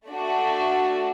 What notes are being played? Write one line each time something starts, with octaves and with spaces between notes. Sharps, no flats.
A3 D4 F#4